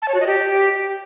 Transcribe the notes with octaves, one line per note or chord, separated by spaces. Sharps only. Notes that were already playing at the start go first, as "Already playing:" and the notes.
A5
C#5
F#4
D#5
G4